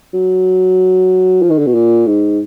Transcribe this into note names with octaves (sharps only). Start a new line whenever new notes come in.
F#3
F3
D#3
D3
B2
A#2
G#2